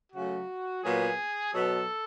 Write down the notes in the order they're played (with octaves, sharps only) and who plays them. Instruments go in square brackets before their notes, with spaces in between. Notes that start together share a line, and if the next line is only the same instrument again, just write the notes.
[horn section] C#3 F#3 A3 F#4
A#2 F#3 B3 G#4
B2 F#3 B3 A4